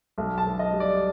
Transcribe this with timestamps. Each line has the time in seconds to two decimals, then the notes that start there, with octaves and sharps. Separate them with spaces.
0.18 B1
0.38 A5
0.45 B1
0.59 D#5
0.72 G3
0.80 D5